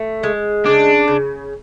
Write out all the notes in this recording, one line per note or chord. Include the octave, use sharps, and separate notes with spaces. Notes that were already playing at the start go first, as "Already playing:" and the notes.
Already playing: A3
G#3
C#3 D4
C#3